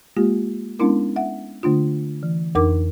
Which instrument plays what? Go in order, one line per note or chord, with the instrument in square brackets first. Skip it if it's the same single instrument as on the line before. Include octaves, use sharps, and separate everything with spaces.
[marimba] G#3 A#3 F4 G4
G#3 B3 C#4 D4 E4 A#4
E5 F#5
D3 A3 D4 F4
E3
F2 D4 D#4 A#4 D6